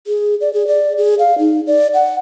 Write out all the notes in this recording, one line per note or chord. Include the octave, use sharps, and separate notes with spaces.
G#4
D5
G#4
D5
G#4
F5
D#4
D5
F#5